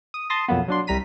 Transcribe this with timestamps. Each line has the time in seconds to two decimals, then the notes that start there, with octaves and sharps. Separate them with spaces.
0.14 D#6
0.30 A5 C6 D#6 A#6
0.48 B1 F2 F#3 A#3 B3
0.68 F#3 D4 C6
0.87 C2 G3 A#5 B6 D#7